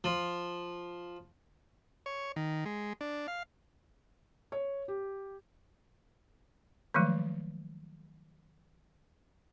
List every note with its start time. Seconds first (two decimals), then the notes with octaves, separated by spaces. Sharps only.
0.04 F3
2.06 C#5
2.36 D#3
2.66 G#3
3.01 D4
3.28 F5
4.52 C#5
4.88 G4
6.94 D#3 F3 F#3 G#3 A3